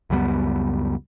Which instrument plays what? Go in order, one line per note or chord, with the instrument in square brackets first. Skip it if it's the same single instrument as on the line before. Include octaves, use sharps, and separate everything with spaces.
[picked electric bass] C#2 F#2 G3 B3